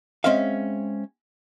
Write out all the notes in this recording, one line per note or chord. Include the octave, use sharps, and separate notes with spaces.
G#3 C4 C#4 E5 F5